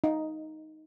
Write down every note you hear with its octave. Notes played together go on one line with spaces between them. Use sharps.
D#4